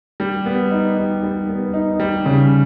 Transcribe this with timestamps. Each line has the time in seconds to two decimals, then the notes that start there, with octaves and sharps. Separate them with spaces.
0.20 G3
0.46 B3
0.72 D#4
0.97 G3
1.23 G3
1.49 B3
1.74 D#4
2.00 G3
2.26 C#3